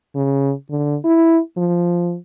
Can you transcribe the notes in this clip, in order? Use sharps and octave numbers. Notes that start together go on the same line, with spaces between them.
C#3
D3
E4
F3